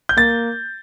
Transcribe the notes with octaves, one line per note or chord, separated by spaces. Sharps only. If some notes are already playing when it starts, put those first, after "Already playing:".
G6
A#3 A6